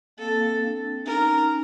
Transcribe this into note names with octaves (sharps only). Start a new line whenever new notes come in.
A#3 C4 A4
C4 D4
C#4 D#4 A#4